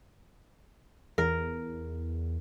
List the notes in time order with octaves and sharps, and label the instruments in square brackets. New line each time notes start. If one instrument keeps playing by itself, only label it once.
[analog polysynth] E2 [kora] A#4